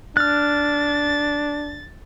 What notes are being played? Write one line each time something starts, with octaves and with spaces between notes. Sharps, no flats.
D4 F6 F#6 A6